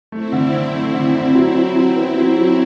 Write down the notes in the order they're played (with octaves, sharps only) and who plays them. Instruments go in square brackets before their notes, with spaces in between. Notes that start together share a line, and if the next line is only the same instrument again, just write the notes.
[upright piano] A3 [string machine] C4 E4
[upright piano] D3
D3
[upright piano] A3 [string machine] C4 E4
[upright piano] D3
D3
F#3
F#3
F#3
B3
F#3
F#3